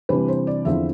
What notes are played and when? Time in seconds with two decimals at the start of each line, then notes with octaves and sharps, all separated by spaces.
0.09 C3 E3 G3 D4 B4
0.28 C5
0.47 D5
0.65 E2 D3 F3 C4 E4 E5